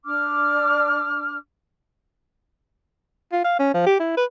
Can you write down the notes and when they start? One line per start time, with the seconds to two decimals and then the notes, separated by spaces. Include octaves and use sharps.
0.04 D4 D6 F6
3.32 F4
3.44 F5
3.59 C#4
3.74 F3
3.86 G4
3.99 E4
4.17 B4